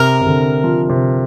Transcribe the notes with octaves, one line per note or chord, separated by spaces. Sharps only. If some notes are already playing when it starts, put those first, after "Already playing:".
Already playing: C3 A#4
C3
D3
F3
C3